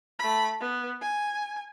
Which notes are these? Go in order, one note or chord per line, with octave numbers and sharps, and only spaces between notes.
A3 B5
B3
G#5